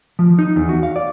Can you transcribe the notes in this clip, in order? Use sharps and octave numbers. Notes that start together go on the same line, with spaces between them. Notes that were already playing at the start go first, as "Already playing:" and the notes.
F3
D#4
E2
F#4
F5
D5